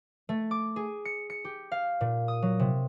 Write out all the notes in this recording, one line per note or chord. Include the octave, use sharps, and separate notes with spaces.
A3
D6
G#4
C#7
C#7
G4
F5
A#2
D#6
F#3
C3